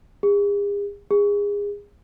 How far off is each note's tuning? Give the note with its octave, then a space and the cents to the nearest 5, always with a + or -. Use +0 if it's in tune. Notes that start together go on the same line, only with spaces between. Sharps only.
G#4 -45
G#4 -25